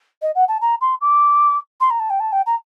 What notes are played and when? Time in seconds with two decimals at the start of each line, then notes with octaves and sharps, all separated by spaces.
0.22 D#5
0.35 F#5
0.48 A5
0.61 A#5
0.81 C6
1.01 D6
1.80 C6
1.90 A#5
2.00 A5
2.10 G5
2.20 A5
2.32 G5
2.46 A#5